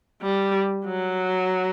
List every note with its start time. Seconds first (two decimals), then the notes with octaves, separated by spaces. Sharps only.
0.22 G3
0.85 F#3